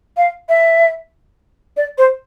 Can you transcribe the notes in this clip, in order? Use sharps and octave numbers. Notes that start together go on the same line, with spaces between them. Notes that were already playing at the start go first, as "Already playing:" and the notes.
F5
E5
D5
C5